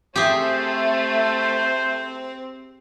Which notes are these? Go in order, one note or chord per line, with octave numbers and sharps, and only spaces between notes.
A3 C4 G4 G#4 C5